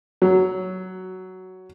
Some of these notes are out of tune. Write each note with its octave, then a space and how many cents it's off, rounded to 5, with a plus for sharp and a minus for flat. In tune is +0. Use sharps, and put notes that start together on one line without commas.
F#3 +10